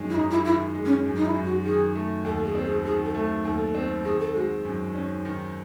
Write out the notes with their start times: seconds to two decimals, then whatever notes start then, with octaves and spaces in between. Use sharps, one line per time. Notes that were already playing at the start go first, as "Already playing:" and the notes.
Already playing: F#2 D#3 G#3
0.09 E4
0.15 F#2 D#4
0.30 E4
0.45 D#3 E4
0.75 G#3
0.85 C#4
1.05 F#2
1.16 D#4
1.25 E4
1.35 F#2
1.44 F#4
1.65 D#3 G#4
1.95 A3
2.25 D#2 A4
2.45 G#4
2.55 C4
2.65 G#4
2.85 D#3 G#4
3.04 A4
3.15 A3
3.44 D#2 A4
3.75 C4
4.05 D#3 G#4
4.20 A4
4.34 G#3 F#4
4.65 F#2
4.95 C#4
5.25 D#3